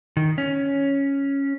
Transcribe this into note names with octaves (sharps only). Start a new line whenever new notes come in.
D#3
C#4